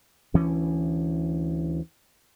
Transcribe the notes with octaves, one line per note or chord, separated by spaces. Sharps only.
D2 E3 C#4